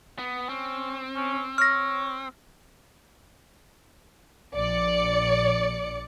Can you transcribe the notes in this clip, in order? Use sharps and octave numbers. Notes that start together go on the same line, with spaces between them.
B3
C4 C#4
C#4
C#5 F6 A#6
A#1 D5 C#7